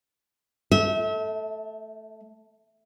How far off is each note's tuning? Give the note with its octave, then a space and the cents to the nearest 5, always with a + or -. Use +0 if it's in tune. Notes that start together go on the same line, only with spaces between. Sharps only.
A3 +0 E5 -35